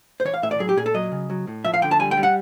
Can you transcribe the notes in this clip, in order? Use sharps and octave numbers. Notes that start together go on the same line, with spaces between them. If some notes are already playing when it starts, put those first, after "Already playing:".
C5
E3 C#5
F5
A2 E5
D5
F#3 G#4
G4
A#2 G#4
A4
F#3 D#5
C#3
F#3
A2
F3 E5
F5
D3 G5
A5
G3 G#5
G5
G3
F#5